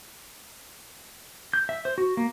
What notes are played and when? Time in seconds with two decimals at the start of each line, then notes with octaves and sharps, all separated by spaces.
1.54 G6
1.69 E5
1.85 C5
1.98 F#4
2.17 A#3